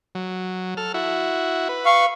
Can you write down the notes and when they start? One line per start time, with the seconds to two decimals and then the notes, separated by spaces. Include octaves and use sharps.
0.15 F#3
0.77 A4 F6
0.94 E4 F#4
1.69 B4
1.86 F5 C#6